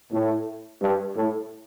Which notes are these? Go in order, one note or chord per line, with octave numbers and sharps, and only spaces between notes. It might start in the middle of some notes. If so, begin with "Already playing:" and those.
A2
G2
A2